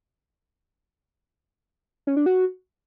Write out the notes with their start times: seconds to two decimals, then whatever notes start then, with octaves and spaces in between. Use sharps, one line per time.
2.07 C#4
2.17 D4
2.26 F#4